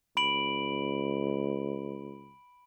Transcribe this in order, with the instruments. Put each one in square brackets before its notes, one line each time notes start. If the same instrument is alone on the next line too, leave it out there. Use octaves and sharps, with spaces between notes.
[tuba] C#2 [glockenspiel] B5 D7 F#7